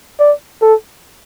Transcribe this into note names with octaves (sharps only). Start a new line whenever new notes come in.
D5
A4